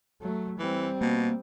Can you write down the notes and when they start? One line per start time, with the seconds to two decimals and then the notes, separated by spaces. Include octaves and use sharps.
0.22 F#3 A3
0.59 E3 G3 C4
1.01 B2 A#3